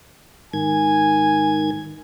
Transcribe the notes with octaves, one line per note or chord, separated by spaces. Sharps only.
G#2 D#3 G#5 G#6